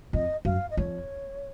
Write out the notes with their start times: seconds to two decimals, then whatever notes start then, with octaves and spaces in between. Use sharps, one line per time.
0.13 F2 D#5
0.45 F#2 F5
0.70 D#5
0.77 F2 C#5